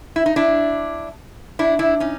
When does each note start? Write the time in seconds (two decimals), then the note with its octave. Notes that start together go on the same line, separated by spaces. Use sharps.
0.16 E4
0.26 D#4
0.36 D4 E4
1.59 D4 E4
1.79 D4 E4
2.00 C#4 D#4